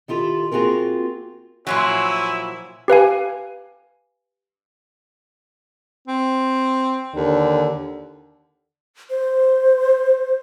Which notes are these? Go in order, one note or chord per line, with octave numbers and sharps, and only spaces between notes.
D#3 E4 F4 G4 A4
A#3 C4 F4 F#4 G#4 A#4
A#2 F3 F#3 E4 C#5 E5 G#5
G4 B4 F5 G#5
C4
D#2 D3
C5